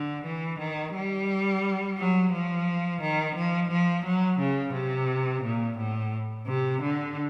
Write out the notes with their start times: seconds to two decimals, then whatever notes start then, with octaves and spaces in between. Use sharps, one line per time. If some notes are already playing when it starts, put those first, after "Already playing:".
Already playing: D3
0.25 E3
0.59 D#3
0.94 G3
1.98 F#3
2.32 F3
3.01 D#3
3.36 F3
3.70 F3
4.05 F#3
4.39 C#3
4.74 C3
5.43 A#2
5.78 A2
6.47 C3
6.82 D3